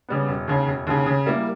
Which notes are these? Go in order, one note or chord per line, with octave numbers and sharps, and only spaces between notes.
C#3 G3 B3
E1
D#2 C#3
E1
D#2 C#3
C#3
G3 A#3 E4